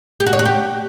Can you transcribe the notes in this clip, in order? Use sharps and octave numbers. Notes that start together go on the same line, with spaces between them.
G4
F#4
C#5
F#4
G4